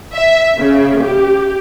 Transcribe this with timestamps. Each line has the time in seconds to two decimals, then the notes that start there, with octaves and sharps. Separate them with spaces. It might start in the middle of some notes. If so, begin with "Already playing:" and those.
0.14 E5
0.58 C#3
1.02 G4